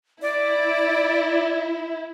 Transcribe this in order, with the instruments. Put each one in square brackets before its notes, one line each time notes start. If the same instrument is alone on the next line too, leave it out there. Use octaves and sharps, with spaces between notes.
[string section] E4 [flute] D5